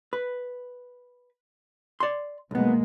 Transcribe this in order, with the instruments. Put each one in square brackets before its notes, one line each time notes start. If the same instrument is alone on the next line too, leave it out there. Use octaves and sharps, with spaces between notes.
[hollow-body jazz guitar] B4
D5 C6
[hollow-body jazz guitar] B1 B3 [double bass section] B2 G#3 A#3